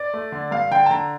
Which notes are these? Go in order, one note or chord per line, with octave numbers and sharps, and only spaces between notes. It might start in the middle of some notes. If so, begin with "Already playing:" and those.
Already playing: D5
A3
D3
G2 F5
D3 G5
A5
D3 A#5